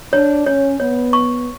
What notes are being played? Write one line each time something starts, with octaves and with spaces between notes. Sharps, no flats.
D4 C#5
C#4 C#5
B3 C#5
C#6